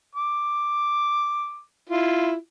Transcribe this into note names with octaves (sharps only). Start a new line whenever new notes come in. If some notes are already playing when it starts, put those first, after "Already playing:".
D6
E4 F4